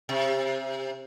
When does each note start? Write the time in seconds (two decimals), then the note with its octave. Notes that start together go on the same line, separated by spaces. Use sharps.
0.09 C3